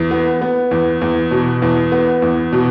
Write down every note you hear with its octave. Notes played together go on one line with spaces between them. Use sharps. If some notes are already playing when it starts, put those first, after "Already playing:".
Already playing: E2
B3
B3
E2
E2
B2
E2
B3
E2
B2